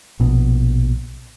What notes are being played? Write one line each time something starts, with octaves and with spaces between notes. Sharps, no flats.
A#1 B2